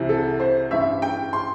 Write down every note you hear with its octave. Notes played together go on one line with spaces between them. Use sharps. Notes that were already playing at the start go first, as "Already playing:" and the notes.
Already playing: C2 C3 E3
A4
C5
A1 G2 E3 E5
G5
C6